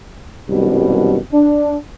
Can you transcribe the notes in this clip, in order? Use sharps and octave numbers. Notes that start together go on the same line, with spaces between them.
C2 F#2 B2 D#3 G3
D4